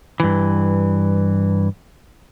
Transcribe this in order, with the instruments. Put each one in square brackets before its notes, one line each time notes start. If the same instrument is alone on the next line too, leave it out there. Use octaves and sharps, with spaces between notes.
[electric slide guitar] G2 E3